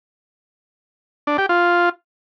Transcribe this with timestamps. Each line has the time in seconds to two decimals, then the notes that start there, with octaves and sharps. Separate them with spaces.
1.27 D4
1.38 G4
1.49 F4